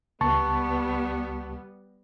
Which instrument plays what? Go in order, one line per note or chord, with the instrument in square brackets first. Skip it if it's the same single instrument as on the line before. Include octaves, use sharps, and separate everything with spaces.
[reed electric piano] C#2 A5 C#6 [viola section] G3 B3